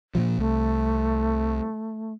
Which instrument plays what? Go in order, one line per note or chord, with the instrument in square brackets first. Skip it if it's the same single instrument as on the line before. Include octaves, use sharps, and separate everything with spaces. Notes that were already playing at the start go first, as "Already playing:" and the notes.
[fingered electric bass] A#2 C#3 F3
[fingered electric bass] C2 [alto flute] A3